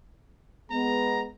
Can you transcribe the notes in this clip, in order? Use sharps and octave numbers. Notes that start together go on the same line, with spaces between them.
G#3 B3 A#5